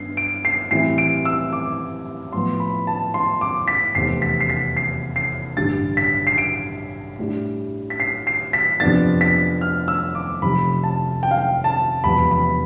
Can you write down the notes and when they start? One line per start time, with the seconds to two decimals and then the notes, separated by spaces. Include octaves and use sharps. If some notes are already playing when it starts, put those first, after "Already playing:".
Already playing: G2 B3 D4 C7
0.17 D7
0.45 C7
0.71 A2 E3 G3 C4 E4 C7
0.98 D7
1.25 E6
1.53 D6
2.33 A2 F3 B3 C6
2.60 B5
2.87 A5
3.14 C6
3.41 D6
3.68 B6
3.95 F1 E2 C3 C7
4.22 B6
4.41 C7
4.50 B6
4.77 C7
5.16 C7
5.57 A1 G2 D3 G3 A6
5.97 B6
6.27 C7
6.38 D7
7.19 A2 G3 D4
7.90 B6
8.00 C7
8.27 C7
8.53 B6
8.80 F2 C3 F3 B3 D4 A6
9.21 B6
9.61 F6
9.88 E6
10.15 D6
10.42 F1 F2 C3 F3 B5
10.84 A5
11.23 G5
11.31 F5
11.38 G5
11.64 A5
12.04 E1 E2 C3 F3 B3 B5
12.31 B5